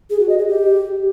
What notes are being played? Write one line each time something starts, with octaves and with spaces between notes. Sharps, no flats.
G#4
F#4
D#5
G#4
G4